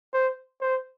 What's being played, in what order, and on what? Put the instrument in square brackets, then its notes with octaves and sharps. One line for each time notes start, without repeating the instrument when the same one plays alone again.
[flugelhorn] C5
C5